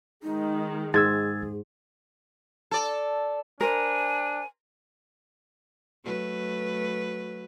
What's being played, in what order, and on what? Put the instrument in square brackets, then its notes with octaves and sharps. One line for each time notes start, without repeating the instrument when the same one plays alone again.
[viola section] D#3 G#3 [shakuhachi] D#4
[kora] G#2 [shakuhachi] G#4 [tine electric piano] E6 G#6 A6
[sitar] A4 D5
[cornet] D4 [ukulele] A#4 C5 [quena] G#5
[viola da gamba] F#3 A3 B4